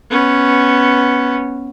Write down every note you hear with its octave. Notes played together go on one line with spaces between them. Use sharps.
B3 C#4